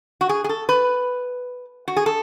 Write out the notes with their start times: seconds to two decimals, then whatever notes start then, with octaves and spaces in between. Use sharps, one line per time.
0.21 F#4
0.29 G#4
0.44 G#4
0.49 A4
0.69 B4
1.88 F#4
1.96 G#4
2.06 A4